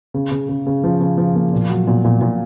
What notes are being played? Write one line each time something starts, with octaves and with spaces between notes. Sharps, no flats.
C#3
C#3
C#3
C#3
F3
C#3
F3
A#3
A#2
F#3
A#2
A#2
A#2